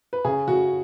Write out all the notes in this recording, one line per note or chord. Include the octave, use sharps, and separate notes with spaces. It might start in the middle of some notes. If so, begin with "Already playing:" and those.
B4
C#3 G#4
C#3 F#4